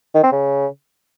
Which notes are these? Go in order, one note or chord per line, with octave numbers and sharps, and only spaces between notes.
D#3
C4
C#3